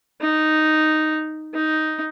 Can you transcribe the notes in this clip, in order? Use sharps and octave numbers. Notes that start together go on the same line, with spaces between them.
D#4
D#4